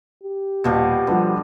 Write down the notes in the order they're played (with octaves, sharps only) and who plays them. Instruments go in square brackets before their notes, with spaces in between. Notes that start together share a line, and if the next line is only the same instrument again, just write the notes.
[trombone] G4
[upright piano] D#1 [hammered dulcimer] B2 F3 G3
[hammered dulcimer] D3 [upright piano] F3 G3 B4